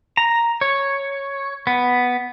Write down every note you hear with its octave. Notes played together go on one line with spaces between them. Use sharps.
A#5
C#5
B3